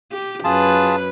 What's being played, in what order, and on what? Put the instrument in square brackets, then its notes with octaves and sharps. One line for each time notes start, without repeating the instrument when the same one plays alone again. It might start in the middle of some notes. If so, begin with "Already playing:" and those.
[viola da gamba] G4
[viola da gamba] F#2 B4 [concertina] F4 G#4 A5